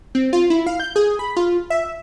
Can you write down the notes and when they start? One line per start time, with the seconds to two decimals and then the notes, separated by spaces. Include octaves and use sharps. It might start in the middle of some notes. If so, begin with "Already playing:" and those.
0.15 C4
0.33 F4
0.50 E4
0.67 F5
0.80 G6
0.96 G#4
1.19 B5
1.37 F4
1.70 E5